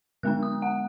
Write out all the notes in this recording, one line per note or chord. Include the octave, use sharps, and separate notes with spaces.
D3 G#3 B3 D4 F#6
D#6
F#5